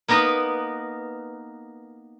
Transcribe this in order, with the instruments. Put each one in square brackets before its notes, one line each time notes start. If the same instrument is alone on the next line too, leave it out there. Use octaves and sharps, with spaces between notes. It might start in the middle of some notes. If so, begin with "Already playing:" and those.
[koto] A#3 B3 D#4 A#4 B4